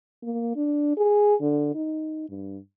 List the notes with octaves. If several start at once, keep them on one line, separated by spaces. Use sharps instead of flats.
A#3
D4
G#4
D3
D#4
G2